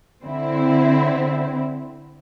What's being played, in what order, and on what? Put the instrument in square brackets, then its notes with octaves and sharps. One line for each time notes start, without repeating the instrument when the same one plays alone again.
[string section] D3 C4 E4